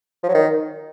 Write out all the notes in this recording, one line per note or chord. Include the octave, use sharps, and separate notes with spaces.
F3
F#3
D#3